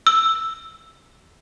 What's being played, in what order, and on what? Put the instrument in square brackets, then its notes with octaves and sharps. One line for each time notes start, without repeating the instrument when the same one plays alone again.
[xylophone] E6